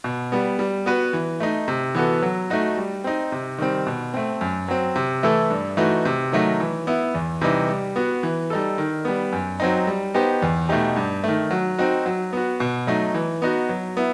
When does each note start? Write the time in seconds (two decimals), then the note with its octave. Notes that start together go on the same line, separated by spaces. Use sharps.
0.04 B2
0.32 G3 B3
0.59 G3
0.86 B3 F#4 B4
1.13 E3
1.40 A3 D#4
1.68 C3
1.95 E3 B3 F#4 A4
2.22 F#3
2.50 A3 D#4 F#4
2.78 G3
3.04 C4 D#4
3.32 C3
3.58 D#3 G3 C4
3.87 B2
4.14 A3 C4
4.41 F#2
4.68 F#3 C4
4.96 C3
5.23 E3 A3 E4 A4
5.50 G2
5.77 E3 A3 D#4 F#4
6.05 C3
6.32 D#3 F#3 A3 D#4
6.60 E3
6.87 B3 E4
7.14 E2
7.41 C3 E3 G3 D#4
7.69 G3
7.96 B3 F#4
8.23 E3
8.50 G3 D#4 A4
8.78 D#3
9.05 G3 B3
9.32 F#2
9.60 F#3 C4 D#4
9.87 G3
10.14 B3 D#4 G4 C5
10.42 E2
10.69 B2 A3 D#4 G4
10.96 G2
11.24 D#3 A3
11.51 F#3
11.78 C4 D#4 F#4
12.06 F#3
12.33 B3 F#4
12.60 B2
12.87 F#3 A3 D#4
13.14 E3
13.42 B3 D#4 F#4
13.69 F#3
13.97 B3 E4